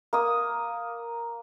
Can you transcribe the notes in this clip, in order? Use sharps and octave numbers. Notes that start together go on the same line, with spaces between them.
A#3 D#6